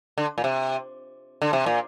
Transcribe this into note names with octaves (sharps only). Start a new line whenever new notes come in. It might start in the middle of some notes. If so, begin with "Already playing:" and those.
D3
A#2
C3
D3
C3
A#2